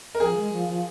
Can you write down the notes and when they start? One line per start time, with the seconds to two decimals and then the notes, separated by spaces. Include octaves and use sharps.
0.15 A#4
0.20 F3 G#4
0.36 G#3
0.52 F3
0.68 F3